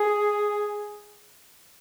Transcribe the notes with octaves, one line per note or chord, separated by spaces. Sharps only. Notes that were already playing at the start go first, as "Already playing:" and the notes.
Already playing: G#4